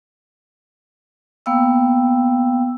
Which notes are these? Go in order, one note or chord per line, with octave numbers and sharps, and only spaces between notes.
A#3 B3 F5 G5 E6